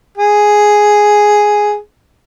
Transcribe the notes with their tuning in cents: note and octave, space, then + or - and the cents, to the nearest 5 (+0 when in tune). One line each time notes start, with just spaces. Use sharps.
G#4 +0